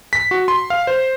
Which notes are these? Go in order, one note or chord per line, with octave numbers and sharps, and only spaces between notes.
B6
F#4
C6
F5
C5